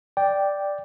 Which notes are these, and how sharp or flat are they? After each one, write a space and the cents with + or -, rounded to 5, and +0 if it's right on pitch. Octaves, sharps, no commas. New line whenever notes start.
D5 +0 G5 +0